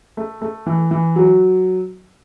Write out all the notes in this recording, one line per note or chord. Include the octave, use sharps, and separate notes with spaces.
A3
A3
E3
E3
F#3